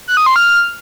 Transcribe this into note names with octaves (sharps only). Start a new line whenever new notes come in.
F#6
D#6
C6
F6